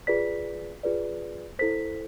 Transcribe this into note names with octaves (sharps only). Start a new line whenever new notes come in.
F4 G#4 B4 D5 B6
F4 G#4 B4 D5
E4 A4 C5 B6